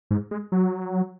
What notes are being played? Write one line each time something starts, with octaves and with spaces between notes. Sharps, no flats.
G#2
G#3
F#3